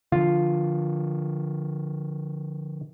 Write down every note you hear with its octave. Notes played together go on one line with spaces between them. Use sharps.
D3 F3 F4